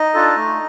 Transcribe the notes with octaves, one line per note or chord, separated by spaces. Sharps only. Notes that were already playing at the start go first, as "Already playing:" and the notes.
Already playing: D#4 D#5
D4 F4 A4
A3